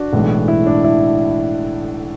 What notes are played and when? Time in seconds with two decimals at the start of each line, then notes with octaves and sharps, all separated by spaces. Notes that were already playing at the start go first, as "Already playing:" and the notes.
Already playing: D4 F#4
0.13 B1 A2 E3 G#3
0.48 E4
0.66 D4
0.84 E4